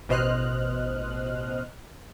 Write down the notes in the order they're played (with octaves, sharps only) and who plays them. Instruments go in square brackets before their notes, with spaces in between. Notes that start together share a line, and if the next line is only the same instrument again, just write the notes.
[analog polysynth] A1 B2 C5 D#5 F6 F#6